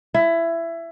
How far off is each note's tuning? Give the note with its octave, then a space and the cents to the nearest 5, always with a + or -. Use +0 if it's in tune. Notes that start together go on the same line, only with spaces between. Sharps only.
E4 +20